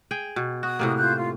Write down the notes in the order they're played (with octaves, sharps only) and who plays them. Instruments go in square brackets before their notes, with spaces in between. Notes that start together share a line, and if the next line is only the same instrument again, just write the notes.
[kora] G#4 G5
B2
[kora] F#4 [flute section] D#6
[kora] A2 C3 A#3
[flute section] F4 F#6 G6
F4